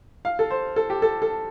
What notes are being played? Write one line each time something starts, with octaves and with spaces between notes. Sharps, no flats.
F5
A4
C5
A4
G4
A4
A4